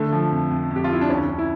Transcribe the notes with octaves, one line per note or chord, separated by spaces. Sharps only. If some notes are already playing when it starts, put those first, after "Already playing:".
Already playing: D3 A3
F3
F2
F2
F2
G4
F4
F2 E4
D4
D2 C#4
D2
E4